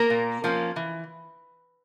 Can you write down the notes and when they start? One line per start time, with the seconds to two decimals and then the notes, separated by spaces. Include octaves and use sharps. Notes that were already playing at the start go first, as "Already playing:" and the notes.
Already playing: A#3 A#4
0.10 A#2
0.44 F3 A#3 C#4
0.76 E3